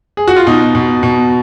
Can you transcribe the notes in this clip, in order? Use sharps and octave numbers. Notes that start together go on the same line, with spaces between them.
G#4
F#4
F4
B2 D#4
B2
B2